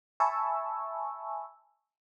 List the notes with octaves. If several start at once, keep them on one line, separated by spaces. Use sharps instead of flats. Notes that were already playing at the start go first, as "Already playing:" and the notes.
E5 G#5 A5 B5 C#6 E6